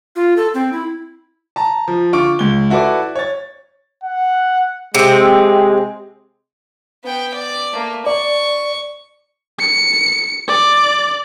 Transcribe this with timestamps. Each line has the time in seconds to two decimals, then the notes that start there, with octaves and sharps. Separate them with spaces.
0.16 F4
0.37 A4
0.54 C4
0.73 E4
1.56 A5 A#5
1.88 F3
2.13 D3 F4 C#6 D6 D7
2.39 C#2 G7
2.70 E4 F#4 A4 B4 D5 D6
3.15 C#5 A6
4.04 F#5
4.95 C3 G#3 C4
7.05 B3 G5
7.34 D5
7.73 A3 A#3
8.06 D5 C#6
9.59 C#7
10.48 D5